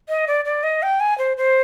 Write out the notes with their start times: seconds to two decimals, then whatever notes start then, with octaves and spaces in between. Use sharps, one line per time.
0.09 D#5
0.27 D5
0.45 D5
0.63 D#5
0.83 G5
1.00 G#5
1.18 C5
1.37 C5